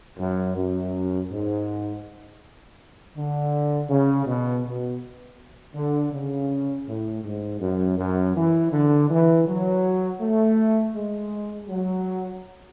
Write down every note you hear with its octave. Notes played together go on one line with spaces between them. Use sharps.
F#2
F#2
G#2
D3
C#3
B2
B2
D3
C#3
A2
G#2
F#2
F#2
E3
D3
E3
F#3
A3
G#3
F#3